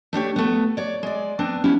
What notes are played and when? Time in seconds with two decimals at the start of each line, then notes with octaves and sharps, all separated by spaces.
0.13 A3 D4 G4 C#5
0.36 A3 B3
0.77 C#5 D5
1.03 G#3 D5
1.39 B3 C4 D4
1.64 B3 C#4 D4 E4 G4